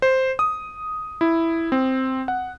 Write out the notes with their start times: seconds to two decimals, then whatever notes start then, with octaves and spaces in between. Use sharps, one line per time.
0.02 C5
0.39 D#6
1.21 E4
1.72 C4
2.28 F#5